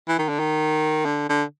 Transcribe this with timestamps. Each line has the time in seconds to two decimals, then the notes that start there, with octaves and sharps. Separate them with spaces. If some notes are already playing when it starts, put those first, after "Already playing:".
0.08 E3
0.19 D#3
0.29 D3
0.39 D#3
1.05 D3
1.29 D3